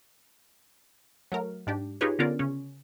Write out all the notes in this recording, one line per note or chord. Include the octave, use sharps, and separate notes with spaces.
F#3 A3 A#4
G#2 D4 G4
D#4 F4 G4 G#4 B4 C#5
D3 B3 C#4 F4 A#4 D5
C#3 C#4